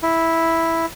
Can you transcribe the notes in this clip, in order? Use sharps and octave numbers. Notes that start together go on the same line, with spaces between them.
E4